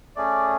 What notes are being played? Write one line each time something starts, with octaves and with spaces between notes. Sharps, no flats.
A3 C#4 G#4 D5